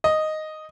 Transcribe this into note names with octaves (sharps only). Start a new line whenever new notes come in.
D#5